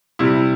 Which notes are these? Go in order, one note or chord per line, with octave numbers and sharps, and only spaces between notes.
C3 G3 E4